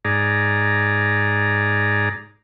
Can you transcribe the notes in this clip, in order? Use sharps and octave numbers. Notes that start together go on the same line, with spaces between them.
G#2 G#4 D5 A#5